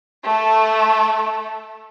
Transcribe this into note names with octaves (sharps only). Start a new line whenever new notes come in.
A3 A4